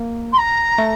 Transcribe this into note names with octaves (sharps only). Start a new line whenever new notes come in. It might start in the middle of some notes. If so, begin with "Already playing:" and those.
Already playing: A#3
C6
A#5
A3